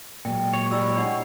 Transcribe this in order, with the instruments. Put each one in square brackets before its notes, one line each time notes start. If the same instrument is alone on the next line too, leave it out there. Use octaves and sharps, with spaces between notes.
[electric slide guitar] A#2 F#3 G#3 [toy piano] G5
[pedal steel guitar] C#5
[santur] G3 [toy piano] E4 E6
[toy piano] D4 D#5 F#5